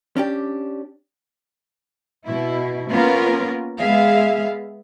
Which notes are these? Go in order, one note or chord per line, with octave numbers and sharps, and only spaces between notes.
C#4 D4 G4
B2 E4
A#3 B3 C#4 F4 A#4
G#3 B3 G#4 E5 F5